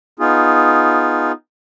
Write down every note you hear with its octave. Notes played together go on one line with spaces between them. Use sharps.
B3 D#4 F4 G#4